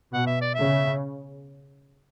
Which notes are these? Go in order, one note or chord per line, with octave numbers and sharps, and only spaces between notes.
B2 F#5
E5
D5
E5
C#3